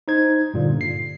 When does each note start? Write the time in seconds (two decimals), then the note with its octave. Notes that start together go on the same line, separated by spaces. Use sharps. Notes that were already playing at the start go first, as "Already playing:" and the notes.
0.08 D#4 C5 G#6
0.54 G2 A#2 D3
0.81 C7